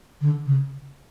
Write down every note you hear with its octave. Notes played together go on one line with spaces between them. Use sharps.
D3
C#3